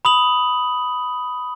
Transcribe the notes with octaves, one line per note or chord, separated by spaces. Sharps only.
B5 D#6 F#7